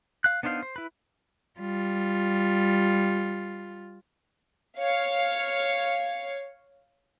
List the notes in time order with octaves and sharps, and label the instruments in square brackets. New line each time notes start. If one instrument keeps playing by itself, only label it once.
[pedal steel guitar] F5 F#6
B3 D4 D#4 C5 F5
C5
E4 B4
[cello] G3 F4
[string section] C#5 F5